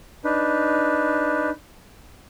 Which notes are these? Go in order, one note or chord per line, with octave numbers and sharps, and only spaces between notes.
D4 D#4 B4